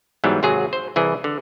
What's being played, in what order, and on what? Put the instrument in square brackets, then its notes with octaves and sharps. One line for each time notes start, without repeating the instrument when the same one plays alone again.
[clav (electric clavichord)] G#2 E3 F#3 G3 B3
G#1 C3 F#3 G#4
C5
C2 E3 G#4
D3